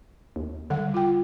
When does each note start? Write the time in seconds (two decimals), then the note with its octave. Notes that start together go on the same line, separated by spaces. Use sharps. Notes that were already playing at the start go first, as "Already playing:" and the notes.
0.36 D#2
0.70 D3 G3 F#5
0.94 F4 G5